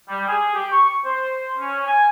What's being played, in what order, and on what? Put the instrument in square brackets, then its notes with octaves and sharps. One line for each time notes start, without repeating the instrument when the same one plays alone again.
[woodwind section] G3
G#4
G4
C#6
C5
C#4
G#5